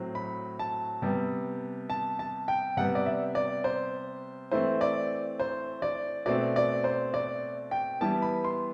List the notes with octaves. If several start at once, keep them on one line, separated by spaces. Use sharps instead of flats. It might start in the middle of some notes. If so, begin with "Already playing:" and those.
Already playing: A2 F#3 C4
B5
A5
C3 G3 B3
A5
A5
G5
C3 G3 B3 F#5
D5
E5
D5
C5
E3 A3 C4 C5
D5
C5
D5
B2 A3 C4 D5
D5
C5
D5
G5
E3 G3 B3 A5
B5
C6